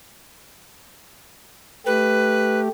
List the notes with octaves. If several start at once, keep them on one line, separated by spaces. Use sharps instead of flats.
A3 G4 B4